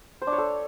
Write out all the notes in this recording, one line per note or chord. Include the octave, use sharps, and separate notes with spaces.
C5
D4
C#5
A4